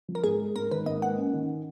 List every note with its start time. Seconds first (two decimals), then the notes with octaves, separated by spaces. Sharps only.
0.08 F3
0.15 A#4
0.24 G#2 G#4
0.40 G#3
0.56 G#2 A#4
0.71 D#3 B4
0.86 G#2 D#5
1.02 A#3 F#5
1.17 C#4
1.33 D#3